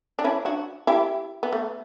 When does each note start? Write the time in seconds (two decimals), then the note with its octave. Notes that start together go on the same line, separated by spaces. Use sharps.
0.19 D4
0.24 C#4 E4
0.45 D4 F#4
0.87 E4 G4
1.43 B3
1.53 A3